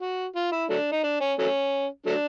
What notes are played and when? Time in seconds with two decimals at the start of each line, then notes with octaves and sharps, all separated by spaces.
0.01 F#4
0.36 F4
0.52 E4
0.70 F#3 A3 D4
0.92 D#4
1.04 D4
1.21 C#4
1.39 F#3 A3 C#4
2.06 F#3 A3 D4